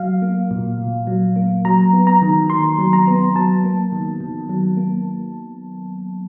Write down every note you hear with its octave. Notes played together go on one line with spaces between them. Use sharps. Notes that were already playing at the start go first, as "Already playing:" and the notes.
Already playing: F#3 F5
A#3
A#2
A#2
F#3
A#3
F#3 A#5
B3
A#5
D#3
D#3 C6
F#3
A#5
B3
F#3 A5
A#3
D#3
D#3
F#3
A#3